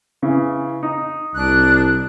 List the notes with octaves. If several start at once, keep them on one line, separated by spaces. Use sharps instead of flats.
C#3 E3
D#4
C2 D4 F#6